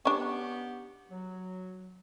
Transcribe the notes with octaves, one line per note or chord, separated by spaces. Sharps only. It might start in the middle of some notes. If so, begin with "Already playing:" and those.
B3 C#4 D4 G4
F#3